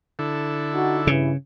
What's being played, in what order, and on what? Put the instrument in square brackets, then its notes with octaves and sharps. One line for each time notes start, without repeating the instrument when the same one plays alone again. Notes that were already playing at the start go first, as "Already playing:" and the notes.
[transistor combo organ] D3 E4 A4
[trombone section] D#4 F#4
[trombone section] G2 E3 [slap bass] C#3